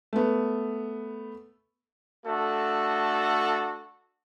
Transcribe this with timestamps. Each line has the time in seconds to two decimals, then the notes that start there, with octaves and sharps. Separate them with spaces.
0.13 A3 B3
2.26 A3 D4 F#4 A4